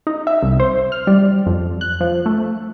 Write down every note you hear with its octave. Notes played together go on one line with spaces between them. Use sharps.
D#4
E5
C2
C5
F6
G3
F2
F#6
F3
A3